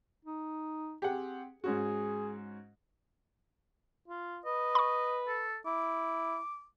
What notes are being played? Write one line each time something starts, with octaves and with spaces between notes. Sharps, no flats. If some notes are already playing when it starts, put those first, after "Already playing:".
D#4
C4 G4 G#4 F#5
G#2 C#4 F#4 G#4
F4
B4 D#5
B5 C#6
A4
E4 D6